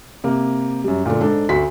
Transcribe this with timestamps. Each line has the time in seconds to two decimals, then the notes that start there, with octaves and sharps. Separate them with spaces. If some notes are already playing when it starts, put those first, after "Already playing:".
0.24 C3 A#3
0.84 F#2 G3
1.06 A#2 D3 A3
1.20 G#2 D4 A4
1.49 D2 D3 F#4 C6 B6